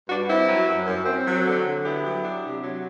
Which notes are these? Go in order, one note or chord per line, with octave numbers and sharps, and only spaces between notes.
G2 D4 F#4
C4 E4
F#3
F#2
F#2
C4
F#3
D3
D3
B3 E4 G4
F#3
D4
C3
F#3